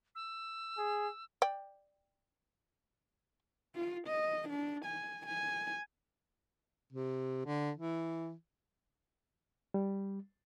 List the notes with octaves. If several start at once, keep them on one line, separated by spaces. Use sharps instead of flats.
E6
G#4
D5 G5
F4
D#5
D4
G#5
G#5
C3
D3
E3
G3